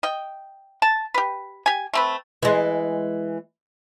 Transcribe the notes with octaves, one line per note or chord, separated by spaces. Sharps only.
D#5 G5
A5
G4 B4
G4 G#5
A3 C4 B4
E3 G#3